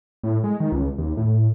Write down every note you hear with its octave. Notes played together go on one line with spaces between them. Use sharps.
A2
G#3
D#3
C#2
D#2
A2